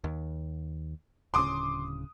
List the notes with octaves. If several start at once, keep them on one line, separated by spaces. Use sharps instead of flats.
D#2
D1 C#3 C6 D6 D#6